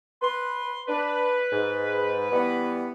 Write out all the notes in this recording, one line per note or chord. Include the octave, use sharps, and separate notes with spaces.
B4 C6
D4 B4
G#2
E3 G3 B3